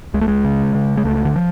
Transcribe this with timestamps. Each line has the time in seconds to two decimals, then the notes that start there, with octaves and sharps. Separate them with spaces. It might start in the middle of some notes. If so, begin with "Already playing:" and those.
0.14 C#2 G#3
0.21 A3
0.28 G#3
0.44 C#3
0.74 C#3
0.97 G#3
1.05 C#2 A3
1.25 D3
1.36 F3